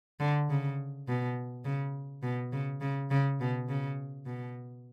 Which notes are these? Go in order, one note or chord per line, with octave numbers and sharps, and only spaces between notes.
D3
C#3
B2
C#3
B2
C#3
C#3
C#3
B2
C#3
B2